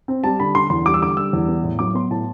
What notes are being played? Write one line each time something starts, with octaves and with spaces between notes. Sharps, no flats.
C4
G3 A5
D3 B5
D3 C6
E2 C6
G3 D6
E6
D3 D6
G3 E6
E2
B3
A2
F#3 D6
B3 C6
A2 A5